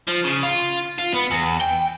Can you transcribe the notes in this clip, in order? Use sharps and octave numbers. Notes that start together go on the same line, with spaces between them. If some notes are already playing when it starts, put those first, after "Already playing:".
F3
C#3
F4
F4
B3
E2
G5